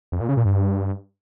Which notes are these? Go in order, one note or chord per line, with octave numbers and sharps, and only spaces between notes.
F2
A#2
C#3
A#2
G2